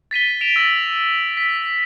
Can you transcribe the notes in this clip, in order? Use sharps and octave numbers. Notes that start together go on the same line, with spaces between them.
A6 B6 D#7 G7
D7 E7 F7
E6 A6 A#6 F#7
B6